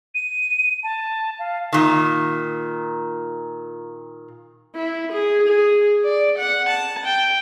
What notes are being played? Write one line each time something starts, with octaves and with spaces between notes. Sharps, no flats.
D#7
A5
F5
A#2 D#3
E4
G#4
G#4
D5
F#5
A5
G5